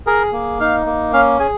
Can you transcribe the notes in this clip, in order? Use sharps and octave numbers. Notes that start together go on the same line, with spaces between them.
G#4 A#4
A#3
D#4 F5
A#3
C#4 F5
G#4 G#5